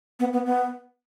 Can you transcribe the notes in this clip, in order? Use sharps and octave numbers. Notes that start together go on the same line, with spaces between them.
B3
B3
B3